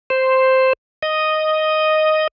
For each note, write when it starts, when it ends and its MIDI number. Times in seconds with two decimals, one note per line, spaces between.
0.10 0.73 72
1.03 2.28 75